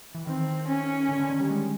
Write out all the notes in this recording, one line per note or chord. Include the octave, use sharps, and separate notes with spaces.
E3
D#3 C4
C#4
D3
D3
D#3
G3
G#3